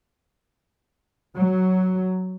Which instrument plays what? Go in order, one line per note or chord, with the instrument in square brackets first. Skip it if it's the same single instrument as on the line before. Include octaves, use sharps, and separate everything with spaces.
[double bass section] F#3